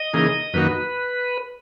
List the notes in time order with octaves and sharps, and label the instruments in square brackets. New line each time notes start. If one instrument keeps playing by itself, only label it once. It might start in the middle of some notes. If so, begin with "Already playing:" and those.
Already playing: [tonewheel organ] D#5
[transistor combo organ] C#3 E3 A#3 D#4 G#4
[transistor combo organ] F#2 D#3 A#3 D#4 F#4 [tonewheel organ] B4